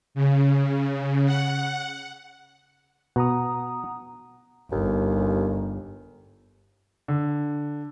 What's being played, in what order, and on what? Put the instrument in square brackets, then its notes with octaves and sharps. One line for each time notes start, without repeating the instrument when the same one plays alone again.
[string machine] C#3
F#5
[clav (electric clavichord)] B2 [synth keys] F#5 A#5 D#6
[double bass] G1 [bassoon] D#2
[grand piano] D3